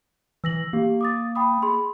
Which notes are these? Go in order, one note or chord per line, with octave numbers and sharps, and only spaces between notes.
E3 E6 A#6 F#7
A#3 G4
D6 D#6 A6
G5 B5 D#6
G#4 B5 C6